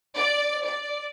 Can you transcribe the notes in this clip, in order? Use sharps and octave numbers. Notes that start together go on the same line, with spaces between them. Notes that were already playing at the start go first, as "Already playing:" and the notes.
D5
D5